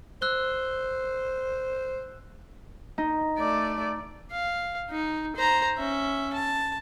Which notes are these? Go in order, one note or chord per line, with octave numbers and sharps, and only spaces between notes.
C5 E6 F#6 G7
D#4
A3 D5
F5
D#4
C5 A#5
C#4 E5
A5